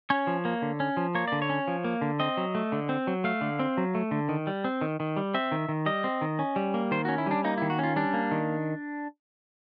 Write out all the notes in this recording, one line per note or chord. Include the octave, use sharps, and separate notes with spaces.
C#4 C#5
F3
A#3
D3
C#4
F3
A#3 C#5
D3 D5
C#5
C#4
F3
A#3
D3
C4 D#5
F#3
A3
D3
C4
F#3
A3 F5
D3
C4
F#3
A3
D3
D#3
G3
C4
D#3
D#3
G3
C4 E5
D#3
D#3
G3 D#5
C4
D#3
C#4
G3
A#3
D#3 C5
C#4 F#4
E4
G3 D4
A#3 D#4
D#3 E4
F#4
C#4 F4
G3 D4
A#3
D#3